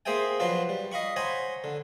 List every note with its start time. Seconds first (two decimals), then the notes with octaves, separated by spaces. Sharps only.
0.06 A#3 G#4 C5 E5 G5 G#5
0.40 F3 F#3 D4 F4 B4 F5
0.69 G3
0.92 D#5 F5 B5 C#6
1.16 C5 C#5 F#5 G#5 A#5 B5
1.64 D3